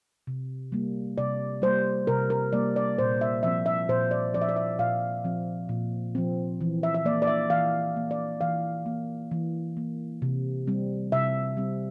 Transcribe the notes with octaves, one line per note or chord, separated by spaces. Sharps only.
C3
G3 A#3
C3 D5
G3 A#3 C5
C3 A#4
A#4
G3 A#3 D5
D5
A#2 C5
E5
F3 C4 E5
E5
A#2 C5
D5
F3 C4 D5
E5
D5
E5
A#2 F5
F3 C4
A#2
F3 C4
E3
E5
E5
A#3 D5
D5
E5
E3 F5
A#3
D5
E3 F5
A#3
E3
A#3
C3
G3 C4
C3 E5
G3 C4